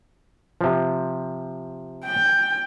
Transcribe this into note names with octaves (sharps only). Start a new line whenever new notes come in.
C3 F3
G5